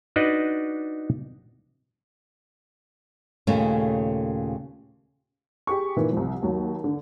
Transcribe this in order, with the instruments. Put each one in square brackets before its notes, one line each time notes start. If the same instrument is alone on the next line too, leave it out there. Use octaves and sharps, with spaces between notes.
[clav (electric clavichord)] D4 D#4 F#4 B4 D5 D#5
[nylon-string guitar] D#2 A#2 C#3 A3 C#4
[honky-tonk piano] G4 G#4 C#6
A#2 D#3 E3
C2 F3
D#2 F#3
D3